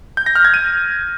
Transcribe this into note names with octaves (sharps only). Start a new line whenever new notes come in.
G6
A#6
F6
G#6
D#7